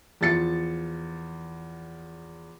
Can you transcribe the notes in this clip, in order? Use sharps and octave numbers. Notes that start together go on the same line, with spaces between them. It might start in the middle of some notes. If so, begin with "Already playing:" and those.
E2 F3 A6 C#7